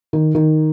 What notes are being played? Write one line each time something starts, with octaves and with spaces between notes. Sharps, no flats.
D#3
D#3